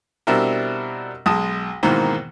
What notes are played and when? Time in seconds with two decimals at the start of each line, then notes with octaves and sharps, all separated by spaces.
0.27 B2 G3 C4 D4 E4 A#4
1.26 B1 G#3 A5 D#6
1.83 G#2 B2 D#3 E3 A#3 C4